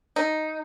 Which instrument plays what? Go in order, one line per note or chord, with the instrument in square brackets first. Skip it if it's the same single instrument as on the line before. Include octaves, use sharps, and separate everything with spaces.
[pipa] D#4